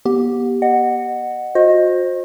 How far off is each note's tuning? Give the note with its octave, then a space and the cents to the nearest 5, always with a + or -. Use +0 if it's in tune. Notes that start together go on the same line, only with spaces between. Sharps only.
B3 -35 G4 +0
D#5 -25 F#5 +0
F#4 -40 C5 +15 D#5 +0